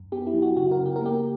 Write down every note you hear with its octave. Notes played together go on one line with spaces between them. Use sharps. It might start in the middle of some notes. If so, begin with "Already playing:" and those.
Already playing: F#2
B3 G4
E4
F#3
F#4
C#3 F#4
A#4
C#3
G4
A#4
A#3 G4